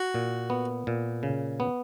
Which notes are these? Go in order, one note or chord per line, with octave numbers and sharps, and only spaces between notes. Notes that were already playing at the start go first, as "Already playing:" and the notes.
Already playing: F#4
A#2
B3
A#2
C#3
B3